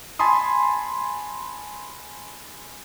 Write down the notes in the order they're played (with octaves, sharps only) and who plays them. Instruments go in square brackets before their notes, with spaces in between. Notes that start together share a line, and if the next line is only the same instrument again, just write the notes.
[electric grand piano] G#5 A5 B5 C6 D#6